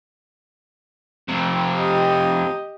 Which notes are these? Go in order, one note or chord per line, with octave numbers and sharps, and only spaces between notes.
F2 C3
G4 D#5